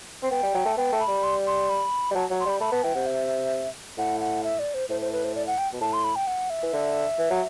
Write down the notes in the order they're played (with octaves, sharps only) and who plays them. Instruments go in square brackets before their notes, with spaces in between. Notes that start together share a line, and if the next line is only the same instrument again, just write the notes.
[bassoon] C4
[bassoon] B3 [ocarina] G5
[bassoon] G3
F#3
A3
[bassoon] B3 [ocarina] G5
[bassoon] A3
[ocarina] B5
[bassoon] G3
[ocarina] C6
C6
B5
[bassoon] G3
[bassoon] F#3 [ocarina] A5
[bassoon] F#3
[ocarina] C6
[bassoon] G3 [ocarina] B5
[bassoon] A3 [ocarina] B5
[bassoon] B3 [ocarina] A5
[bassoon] E3 [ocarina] G5
[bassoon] C3 [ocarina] F#5
[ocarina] E5
[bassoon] A2 [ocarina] F#5
[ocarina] F#5
E5
D5
C5
[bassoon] A2 [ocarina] C5
[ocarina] C5
B4
C5
D5
F#5
G5
[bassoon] B2
[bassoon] A2 [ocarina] A5
[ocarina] C6
B5
G5
F#5
E5
[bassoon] E3
D3
E3
F#3